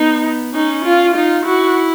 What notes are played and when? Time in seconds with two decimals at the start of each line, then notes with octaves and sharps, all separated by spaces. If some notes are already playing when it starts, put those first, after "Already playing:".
Already playing: B3 D#4
0.54 C#4 D#4
0.85 F4
1.15 D#4 F4
1.45 E4 F#4